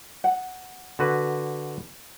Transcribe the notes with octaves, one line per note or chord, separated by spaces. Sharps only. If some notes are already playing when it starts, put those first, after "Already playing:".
F#5
D3 F#4 B4